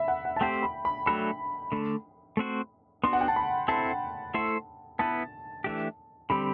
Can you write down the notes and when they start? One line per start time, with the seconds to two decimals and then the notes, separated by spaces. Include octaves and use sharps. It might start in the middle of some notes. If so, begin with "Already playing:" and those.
Already playing: E5 B5
0.08 F#5
0.25 F#5
0.36 A5
0.41 A3 C4 G4 C5 G5
0.63 B5
0.85 B5
1.06 F#3 A3 D4 F#4 A4 B5
1.72 D3 A3 D4
2.37 A3 C4 F#4 C5
3.04 B3 D4 F#4 C6
3.13 F#5
3.21 G5
3.28 A5
3.36 B5
3.68 C4 E4 A4 C5 A5
4.34 A3 E4 A4 C5
4.99 B3 E4 B4 A5
5.64 E3 A3 D4 G4
6.30 D3 G3 C4 G4 B5